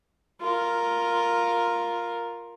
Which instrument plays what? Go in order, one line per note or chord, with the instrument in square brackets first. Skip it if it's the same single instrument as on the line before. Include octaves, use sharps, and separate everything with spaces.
[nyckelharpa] F4 A#4